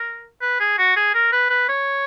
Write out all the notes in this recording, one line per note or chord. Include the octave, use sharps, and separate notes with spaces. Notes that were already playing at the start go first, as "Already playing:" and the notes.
Already playing: A#4
B4
G#4
F#4
G#4
A#4
B4
B4
C#5